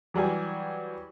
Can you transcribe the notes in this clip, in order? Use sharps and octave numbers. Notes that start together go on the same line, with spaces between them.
E3 F#3 G3 G#5